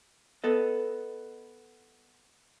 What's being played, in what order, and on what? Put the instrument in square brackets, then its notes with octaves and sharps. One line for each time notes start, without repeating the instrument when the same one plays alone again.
[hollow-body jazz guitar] B3 A4 D#5